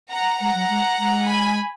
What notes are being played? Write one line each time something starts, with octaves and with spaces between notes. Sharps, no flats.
F#5 A#5
G#3 F#5 A#5
F#3
G#3
G#3
G#5 B5